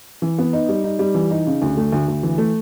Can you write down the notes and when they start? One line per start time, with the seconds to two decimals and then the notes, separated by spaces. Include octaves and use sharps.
0.22 E3
0.38 B3
0.53 D#4
0.69 G3
0.84 D#4
0.99 G3
1.15 E3
1.31 D#4
1.46 C#3
1.62 D2
1.77 A3
1.92 D2
2.08 D2
2.23 E3
2.38 A3